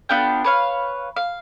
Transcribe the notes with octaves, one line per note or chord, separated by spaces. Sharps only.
B3 D4 F4 G5
B4 C#5 F5
F5